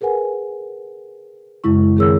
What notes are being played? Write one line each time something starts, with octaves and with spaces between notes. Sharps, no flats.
G#4 A#4 B4 F#5 G#5
F#2 C#3 G#3 E4 C#6
D#3 C4 G#4 A#4 C#5 E6